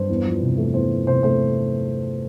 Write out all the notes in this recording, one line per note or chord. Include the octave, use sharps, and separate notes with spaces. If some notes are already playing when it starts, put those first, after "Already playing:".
Already playing: G2 C5
E2
F3
C3
A3
E2 C5
F3
C3 C5
A3 C5